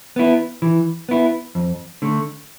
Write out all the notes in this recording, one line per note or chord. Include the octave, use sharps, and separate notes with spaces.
B3 E4
E3
B3 E4
F2
D3 A3